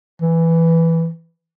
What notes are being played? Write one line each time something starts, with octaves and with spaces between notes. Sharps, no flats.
E3